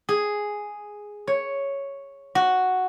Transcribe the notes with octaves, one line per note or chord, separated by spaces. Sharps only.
G#4
C#5
F#4